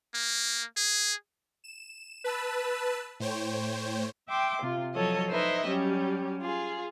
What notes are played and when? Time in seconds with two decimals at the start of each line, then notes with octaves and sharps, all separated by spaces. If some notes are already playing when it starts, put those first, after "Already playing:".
0.14 A#3
0.77 G#4
1.64 E7
2.24 B4 A5 E6
3.20 A2 C5 C#5 G5
4.29 E5 G5 C6 D6
4.62 C3 F4
4.95 F3 F#3 A4 C#5 D#5
5.30 D#4 E4 B4 C5 D#5 E5
5.67 F#3 G3 C#4 G4
6.40 F4 G#4